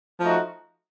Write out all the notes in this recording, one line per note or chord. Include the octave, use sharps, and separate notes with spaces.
F3 A3 D#4 F#4